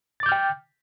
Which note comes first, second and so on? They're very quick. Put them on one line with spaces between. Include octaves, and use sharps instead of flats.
A6 D6 G6 F6 G5